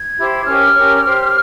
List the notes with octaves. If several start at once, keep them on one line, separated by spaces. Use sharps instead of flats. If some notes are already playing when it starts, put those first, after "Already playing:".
Already playing: G#6
E4 G4 C5
C#4 G4 A#4 C#5 F6
C#4 G4 A#4 C#5
G4 C5